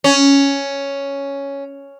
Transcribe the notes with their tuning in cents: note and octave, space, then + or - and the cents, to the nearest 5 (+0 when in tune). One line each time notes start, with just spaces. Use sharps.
C#4 +5